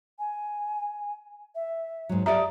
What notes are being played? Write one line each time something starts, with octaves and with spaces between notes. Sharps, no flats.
G#5
E5
G#2 F#3
G4 A4 D5 E5 A#5 D#6